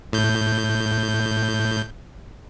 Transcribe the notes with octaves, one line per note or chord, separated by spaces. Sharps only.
A2 G6